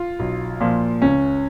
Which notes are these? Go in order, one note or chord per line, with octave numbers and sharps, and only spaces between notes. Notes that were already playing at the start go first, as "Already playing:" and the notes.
Already playing: F4
B1
A#2 F3
C#2 C#4